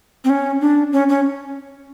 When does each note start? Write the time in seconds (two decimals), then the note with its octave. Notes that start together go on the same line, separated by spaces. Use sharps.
0.24 C4
0.30 C#4
0.61 D4
0.92 C#4
1.09 C#4